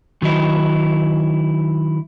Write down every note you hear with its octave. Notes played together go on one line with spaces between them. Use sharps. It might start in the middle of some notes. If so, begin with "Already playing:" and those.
D#3 F#3 D#4 E4